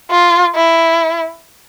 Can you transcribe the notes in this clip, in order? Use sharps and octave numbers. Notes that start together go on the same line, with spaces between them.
F4
E4